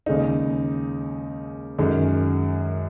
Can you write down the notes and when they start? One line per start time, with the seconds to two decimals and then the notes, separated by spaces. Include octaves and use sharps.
0.06 D#2 C#3 G#3 D#4
1.79 F#2 D#3 G#3